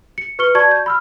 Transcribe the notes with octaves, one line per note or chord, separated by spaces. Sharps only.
C#7
B4 C#6 F6 C#7 G7
F#4 D5 A5 C#6 G#6
G6
B5 E6 F6